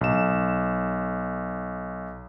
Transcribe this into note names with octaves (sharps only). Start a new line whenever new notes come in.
B1 E7